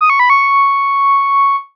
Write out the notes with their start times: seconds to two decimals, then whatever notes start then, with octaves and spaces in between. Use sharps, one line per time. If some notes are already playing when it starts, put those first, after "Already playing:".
0.01 D#6
0.10 C#6
0.20 B5
0.30 C#6